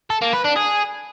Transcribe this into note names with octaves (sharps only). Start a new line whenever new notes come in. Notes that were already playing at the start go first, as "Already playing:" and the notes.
A4
A#3
B4
D4
G#4